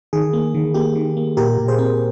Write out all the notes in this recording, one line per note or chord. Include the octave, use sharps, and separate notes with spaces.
D#3 G#4
A#3
D#3
A#3 G4
D#3
A#3
A#2 G4 A#4
A#2
G#4 C5
C4